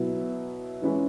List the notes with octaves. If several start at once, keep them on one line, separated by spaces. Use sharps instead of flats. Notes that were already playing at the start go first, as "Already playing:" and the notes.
Already playing: B2 F#3 B3 E4
E3 G#3 C#4 E4 B4